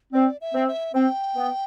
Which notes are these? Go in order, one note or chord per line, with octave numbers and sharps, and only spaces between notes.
C4 D5
E5
C4
E5
C4 G5
B3